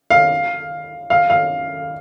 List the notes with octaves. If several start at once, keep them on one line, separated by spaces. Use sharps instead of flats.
F5
F5
F5